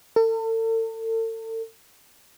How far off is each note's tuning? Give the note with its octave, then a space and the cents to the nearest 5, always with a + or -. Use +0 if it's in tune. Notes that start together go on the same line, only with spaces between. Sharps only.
A4 +40